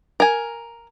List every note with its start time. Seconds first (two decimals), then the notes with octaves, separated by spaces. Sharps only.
0.20 A#4 G#5